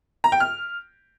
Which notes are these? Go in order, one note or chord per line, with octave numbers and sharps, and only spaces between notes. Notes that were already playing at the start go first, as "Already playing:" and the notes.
A#5
G5
F6